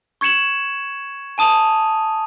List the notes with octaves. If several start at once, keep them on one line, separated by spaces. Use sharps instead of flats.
C#6 G#6 C#7 E7 F#7
G#5 A5 D#6 D#7 F7